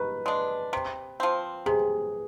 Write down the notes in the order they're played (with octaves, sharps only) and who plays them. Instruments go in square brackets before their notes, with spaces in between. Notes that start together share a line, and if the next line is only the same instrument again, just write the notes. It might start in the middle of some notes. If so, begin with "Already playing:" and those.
Already playing: [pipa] D#3 [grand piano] B4
[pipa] G#3 D4
C3
F3 C4
[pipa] C3 [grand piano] G#4